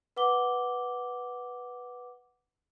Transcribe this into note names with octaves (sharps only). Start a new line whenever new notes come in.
B4 F#5 D6 G7